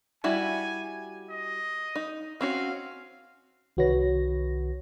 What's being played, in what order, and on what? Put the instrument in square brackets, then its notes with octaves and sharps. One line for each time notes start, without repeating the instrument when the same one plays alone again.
[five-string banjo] G3 E4 F#4 [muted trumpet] G#5
[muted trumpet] D#5
[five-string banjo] D#4
[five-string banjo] C4 C#4 F#4 [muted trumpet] F5
[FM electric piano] C2 D#3 F#4 B4 C#5 A#6